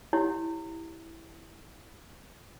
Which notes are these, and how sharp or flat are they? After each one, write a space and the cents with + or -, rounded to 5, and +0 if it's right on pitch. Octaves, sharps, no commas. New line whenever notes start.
E4 -5 G4 +0 C#5 +0